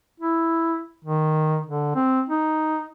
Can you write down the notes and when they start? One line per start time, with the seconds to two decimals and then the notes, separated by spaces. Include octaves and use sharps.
0.20 E4
1.05 D#3
1.67 D3
1.95 C4
2.29 D#4